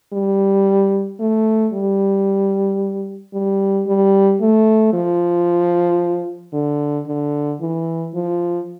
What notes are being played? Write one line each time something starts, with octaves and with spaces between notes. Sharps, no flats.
G3
A3
G3
G3
G3
A3
F3
D3
D3
E3
F3